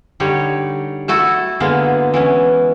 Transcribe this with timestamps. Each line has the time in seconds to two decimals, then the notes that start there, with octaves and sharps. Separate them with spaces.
0.20 D3 G3 D#4 C#5
1.08 A3 E4 F#4 A4
1.60 D3 G#3 A#3 B3
2.14 E3 B3 C#4